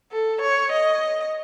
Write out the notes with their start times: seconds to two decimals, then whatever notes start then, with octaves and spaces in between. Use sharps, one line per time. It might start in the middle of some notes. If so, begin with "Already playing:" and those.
0.12 A4
0.41 C#5
0.71 D#5